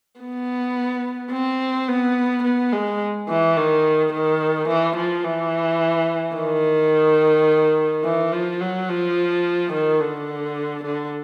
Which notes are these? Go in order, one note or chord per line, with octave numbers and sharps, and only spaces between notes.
B3
C4
B3
B3
G#3
E3
D#3
D#3
E3
F3
E3
D#3
E3
F3
F#3
F3
D#3
D3
D3